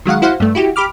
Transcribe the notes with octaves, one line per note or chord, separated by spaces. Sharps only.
D#3 F#3 G#3 F5 F#5
E4 F#4 C5 F5 F#5
G2 A3
E4 F#4 G4
G4 B5 D6 F6